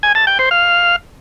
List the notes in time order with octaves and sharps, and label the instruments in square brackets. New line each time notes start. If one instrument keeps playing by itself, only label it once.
[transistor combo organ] G#5
A5
G5
C5
F5